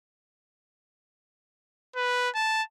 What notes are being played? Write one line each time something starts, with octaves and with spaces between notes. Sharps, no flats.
B4
A5